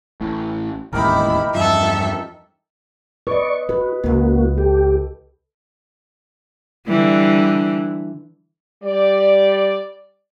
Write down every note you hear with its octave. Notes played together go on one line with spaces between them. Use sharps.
A1 A2
E1 A1 D#2 D#4 E4 G4 A#4 B5
E2 G2 F3 A4 E5
B4 D5 D#5 C#6
F4 F#4 B4
C#2 C#3 A#3 F#4
G4 A4
D3 E3 G3
G3 D5